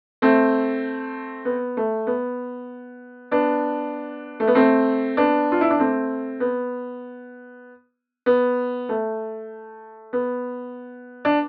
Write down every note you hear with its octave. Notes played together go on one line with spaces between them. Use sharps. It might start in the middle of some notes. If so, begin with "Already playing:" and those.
A3 C4
B3
A3
B3
B3 D4
A3
B3
A3 C4
B3 D4
F4
E4
D4
A3 C4
B3
B3
A3
B3
D4